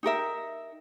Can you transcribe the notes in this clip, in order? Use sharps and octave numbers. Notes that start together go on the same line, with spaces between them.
D#4 G4 A#4 E5